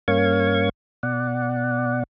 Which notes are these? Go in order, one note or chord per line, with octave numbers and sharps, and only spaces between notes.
G2 A#3 C#4 F5 C#6 G#6
B2 D5 F#5